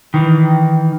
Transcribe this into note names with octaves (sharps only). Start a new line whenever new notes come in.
D#3 E3